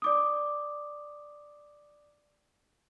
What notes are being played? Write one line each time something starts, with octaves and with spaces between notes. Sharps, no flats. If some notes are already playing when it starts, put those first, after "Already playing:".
D5 D6 D#6